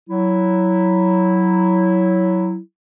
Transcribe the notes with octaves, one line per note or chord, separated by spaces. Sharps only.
F#3 E4